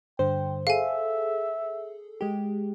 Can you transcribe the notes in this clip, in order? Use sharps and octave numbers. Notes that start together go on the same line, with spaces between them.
G2 D3 C5 G5
G#4 A4 E5 F5 G#5
G#3 G4